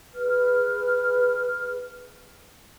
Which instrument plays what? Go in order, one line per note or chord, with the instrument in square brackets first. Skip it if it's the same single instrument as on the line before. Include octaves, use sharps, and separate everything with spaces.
[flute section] G#4 B4 F6